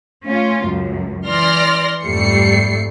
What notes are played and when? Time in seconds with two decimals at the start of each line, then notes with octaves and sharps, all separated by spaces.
0.25 A3 C#4 F4
0.65 C#2 F#2
1.27 E3 D5 C6 F6 A#6
2.03 F2 G#2 G3 A3 C7 C#7